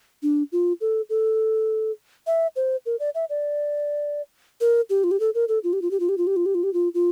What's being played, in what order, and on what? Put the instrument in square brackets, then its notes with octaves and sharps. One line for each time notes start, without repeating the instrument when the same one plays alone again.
[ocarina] D4
F4
A4
A4
E5
C5
A#4
D5
E5
D5
A#4
G4
F4
G4
A4
A#4
A4
F4
G4
F4
G4
F4
G4
F4
G4
F4
G4
F4
G4
F4
F4